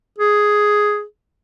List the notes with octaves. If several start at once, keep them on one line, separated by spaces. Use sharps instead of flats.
G#4